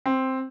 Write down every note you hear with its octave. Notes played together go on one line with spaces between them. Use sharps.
C4